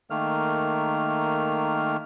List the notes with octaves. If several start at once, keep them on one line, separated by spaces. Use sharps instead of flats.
D#3 A3 A#3 F6